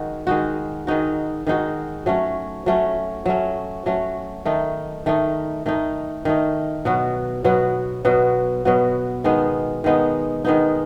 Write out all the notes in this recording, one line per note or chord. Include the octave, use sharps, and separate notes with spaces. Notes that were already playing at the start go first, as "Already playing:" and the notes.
Already playing: D#3 G#3 D#4 F#4
D#3 G#3 D#4 F#4
D#3 G#3 D#4 F#4
D#3 G#3 D#4 F#4
F#3 A3 C#4
F#3 A3 C#4
F#3 A3 C#4
F#3 A3 C#4
D#3 A3 D#4
D#3 A3 D#4
D#3 A3 D#4
D#3 A3 D#4
B2 F#3 B3 F#4
B2 F#3 B3 F#4
B2 F#3 B3 F#4
B2 F#3 B3 F#4
D#3 G#3 B3 D#4
D#3 G#3 B3 D#4
D#3 G#3 B3 D#4